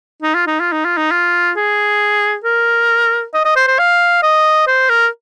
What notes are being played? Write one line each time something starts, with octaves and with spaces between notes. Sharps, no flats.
D#4
F4
D#4
F4
D#4
F4
D#4
F4
G#4
A#4
D#5
D#5
C5
C5
F5
D#5
C5
A#4